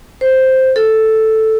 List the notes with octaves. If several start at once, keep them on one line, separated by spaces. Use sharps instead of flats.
C5
A4